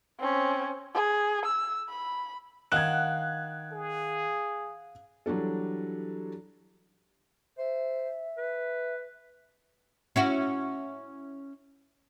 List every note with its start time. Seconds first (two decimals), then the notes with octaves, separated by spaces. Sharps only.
0.19 C4 C#4
0.94 G#4
1.45 E6
1.89 B5
2.72 D#3 F5 F#5 F#6 G#6
3.72 G#4
5.26 E3 F#3 G3 D4 A4
7.58 C5 E5
8.38 B4
10.16 C#4 E4 F#4